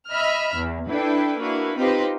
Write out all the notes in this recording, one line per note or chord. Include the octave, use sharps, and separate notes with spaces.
D#5 E5 B5 F6
E2
D4 E4 A4 B4 G5
A#3 D4 E4 F#4 B4
C4 D#4 F4 G4 B4 C5